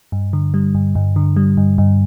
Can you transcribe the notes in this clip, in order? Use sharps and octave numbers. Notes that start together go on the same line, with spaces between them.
G2
D3
G3
G2
G2
D3
G3
G2
G2